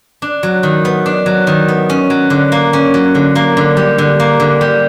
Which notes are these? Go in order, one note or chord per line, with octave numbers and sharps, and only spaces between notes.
D4
F#3
D#3
B3
D4
F#3
D#3
B3
C#4
F#3
D3
A#3
C#4
F#3
D3
A#3
D3
G3
D3
A#3
D3
G3